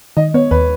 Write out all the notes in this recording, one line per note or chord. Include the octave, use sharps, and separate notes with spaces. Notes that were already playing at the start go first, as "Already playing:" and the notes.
D#3 D#5
B3 C#5
D#2 B4